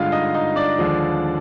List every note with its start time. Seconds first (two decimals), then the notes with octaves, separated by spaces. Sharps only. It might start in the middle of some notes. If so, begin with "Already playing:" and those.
Already playing: G2 D3 G#3 F4 F5
0.12 D#4 D#5
0.34 D#4 D#5
0.56 D4 D5
0.79 D#2 D3 F3 G#3